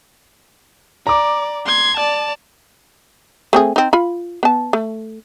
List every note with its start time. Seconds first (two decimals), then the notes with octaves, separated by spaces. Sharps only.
1.07 D5 A#5 D6
1.66 C6 G#6
1.97 D5 A5
3.53 A3 C4 G#4
3.76 C4 D#4
3.93 F4 B5
4.43 B3 A5
4.73 A3